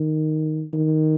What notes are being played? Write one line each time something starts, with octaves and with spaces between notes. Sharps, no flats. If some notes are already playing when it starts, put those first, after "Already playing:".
Already playing: D#3
D#3